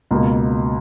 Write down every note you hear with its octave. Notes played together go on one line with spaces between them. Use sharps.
C#2 B2 A#3